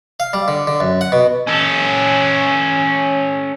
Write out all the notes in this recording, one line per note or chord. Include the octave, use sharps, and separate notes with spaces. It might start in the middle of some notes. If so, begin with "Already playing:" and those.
F5
G3
D3
D3
F#2
F#5
B2
C#4 A4